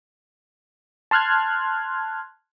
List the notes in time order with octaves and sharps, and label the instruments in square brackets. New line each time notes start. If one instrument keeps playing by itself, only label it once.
[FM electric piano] A5 C6 F6 F#6 G#6